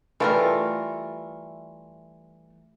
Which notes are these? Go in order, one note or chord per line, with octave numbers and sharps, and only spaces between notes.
E3 G3 A3 F4 A4 A#4